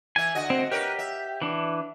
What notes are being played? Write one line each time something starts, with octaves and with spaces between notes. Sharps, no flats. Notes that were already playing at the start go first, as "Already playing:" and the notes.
E3 E5 G#5
D3 F#4 D#5
C4
G4 A#4 B4 C#5
E5
E3 D4